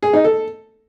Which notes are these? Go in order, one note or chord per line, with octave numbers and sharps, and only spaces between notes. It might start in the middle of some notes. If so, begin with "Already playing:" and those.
G#4
D#4
A4